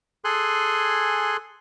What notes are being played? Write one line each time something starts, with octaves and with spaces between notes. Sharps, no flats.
G#4 A4 G#5 C6 F#6